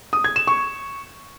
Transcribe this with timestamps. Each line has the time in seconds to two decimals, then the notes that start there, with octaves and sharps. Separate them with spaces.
0.13 D#6
0.24 G#6
0.36 E7
0.47 C#6